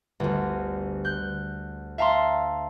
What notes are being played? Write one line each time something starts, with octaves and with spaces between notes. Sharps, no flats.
G1 D2
F#6 G6
E5 F5 A5 A#5 C6